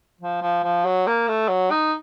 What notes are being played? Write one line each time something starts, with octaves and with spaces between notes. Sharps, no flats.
F3
F3
F3
F#3
A#3
A3
F#3
D#4